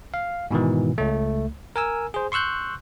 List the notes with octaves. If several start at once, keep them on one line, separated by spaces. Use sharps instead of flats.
F5
G#2 B2 D#3 E3
C#2 A3
A#4 G#5 E6
G#4 C5
C6 C#6 E6 F#6 G6